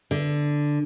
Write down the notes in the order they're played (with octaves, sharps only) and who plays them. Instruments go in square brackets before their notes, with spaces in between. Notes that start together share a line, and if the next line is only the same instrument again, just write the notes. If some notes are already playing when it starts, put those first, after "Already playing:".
[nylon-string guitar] D3